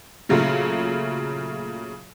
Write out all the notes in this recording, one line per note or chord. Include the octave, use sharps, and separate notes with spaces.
A#2 C#3 F#3 A3 E4 F4